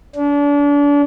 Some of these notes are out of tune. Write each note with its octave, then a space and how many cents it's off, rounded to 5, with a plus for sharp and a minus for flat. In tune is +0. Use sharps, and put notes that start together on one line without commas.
D4 -35